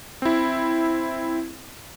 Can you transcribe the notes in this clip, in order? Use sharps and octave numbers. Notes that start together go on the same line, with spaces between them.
C4 E4